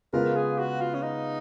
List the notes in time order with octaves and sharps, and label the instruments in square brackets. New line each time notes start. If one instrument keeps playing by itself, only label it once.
[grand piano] C#3 G#3 B3 F4 [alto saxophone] A#4
[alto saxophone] G#4
F#4
F4
C#4
D#4